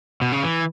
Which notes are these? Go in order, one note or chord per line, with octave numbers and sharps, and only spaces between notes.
B2
C#3
E3